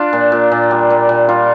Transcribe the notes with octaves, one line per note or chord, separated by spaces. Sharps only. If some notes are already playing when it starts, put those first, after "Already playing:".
Already playing: D4 F4
A#2
A#2
A#2
G3
A#2
A#2
G3 F4